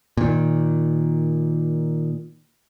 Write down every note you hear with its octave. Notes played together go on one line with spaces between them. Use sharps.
A#2 D#3